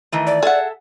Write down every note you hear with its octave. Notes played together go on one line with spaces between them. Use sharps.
D#3 E3 A3
D5
G#4 A4 E5 F#5